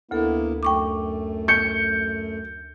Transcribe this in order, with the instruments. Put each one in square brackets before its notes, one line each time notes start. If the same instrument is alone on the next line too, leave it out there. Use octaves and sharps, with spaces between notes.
[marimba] D2 A4 [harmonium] A#3 B3 E4
[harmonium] F#2 A3 [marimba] G5 C#6 D6
[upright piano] G6 C#7